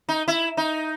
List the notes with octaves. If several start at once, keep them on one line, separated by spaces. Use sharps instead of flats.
D#4
E4
D#4